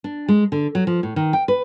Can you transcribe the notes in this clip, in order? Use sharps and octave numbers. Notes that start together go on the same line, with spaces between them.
D4
G#3
D3
F#3
F3
A2
D#3
G5
B4